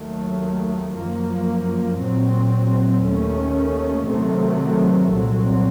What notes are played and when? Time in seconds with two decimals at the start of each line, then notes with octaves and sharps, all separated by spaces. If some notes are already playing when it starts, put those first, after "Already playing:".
Already playing: D#2 D#3 F#3 A3
0.96 F#2 F3 A#3
2.00 A#2 F#3 C4
3.05 D#2 D#3 A3 C#4
4.09 C3 D#3 F#3 A3 C4
5.13 C2 A#2 F#3 C4